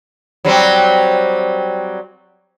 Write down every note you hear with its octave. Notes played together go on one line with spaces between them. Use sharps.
F#3 G3 C4